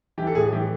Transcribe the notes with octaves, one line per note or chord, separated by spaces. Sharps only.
E3 G4
A4
A2 G#4
E3 G4